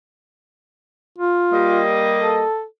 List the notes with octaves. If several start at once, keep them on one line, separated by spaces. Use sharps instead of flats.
F4
G3 A#3 D#5
A4